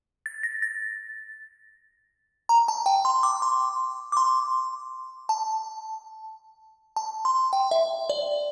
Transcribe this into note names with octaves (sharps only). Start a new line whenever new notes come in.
A6
A#6
A6
A#5
A5
G5
C6
D6
C6
D6
C6
A5
A5
C6
G5
E5
D5